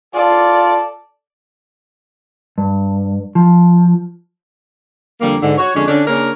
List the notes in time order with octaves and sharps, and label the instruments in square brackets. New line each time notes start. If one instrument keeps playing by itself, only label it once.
[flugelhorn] F4 [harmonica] A4 [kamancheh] D5
[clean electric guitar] G2
F3
[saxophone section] F2 D3 G3 A#3
G#2 D3
F#4 C#5
F2 D3 G#3 C#4 D4
D3 C#4 D4
C#3 A#3 C#4 D4 A#4